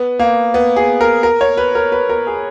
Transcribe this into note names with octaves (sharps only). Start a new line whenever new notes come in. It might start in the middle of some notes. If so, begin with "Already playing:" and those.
Already playing: B3
A#3
B3
G#4
A#4
A#4
C#5
B4
A#4
B4
A#4
G#4